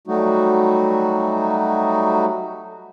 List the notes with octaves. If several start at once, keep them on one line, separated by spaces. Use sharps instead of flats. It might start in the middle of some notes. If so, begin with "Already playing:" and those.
F#3 G3 A3 D#4 F#4